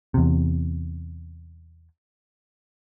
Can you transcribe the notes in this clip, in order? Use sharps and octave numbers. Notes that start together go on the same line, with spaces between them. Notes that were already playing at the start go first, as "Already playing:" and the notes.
E2 C3